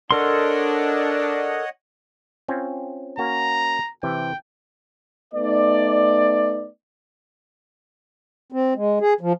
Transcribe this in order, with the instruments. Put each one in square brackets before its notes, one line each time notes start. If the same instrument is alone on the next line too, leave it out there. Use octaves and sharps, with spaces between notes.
[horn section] D4 [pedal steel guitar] A4 A#4 C6 [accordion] C#5 D#5 F#5
[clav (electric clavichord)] C4 C#4 F4
[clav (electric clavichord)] A#3 C#4 F#4 [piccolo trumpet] A#5
[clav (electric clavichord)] C3 E3 [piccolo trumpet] G5
[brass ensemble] A3 B3 D#4 D5
[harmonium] C4
G#3
G#4
F3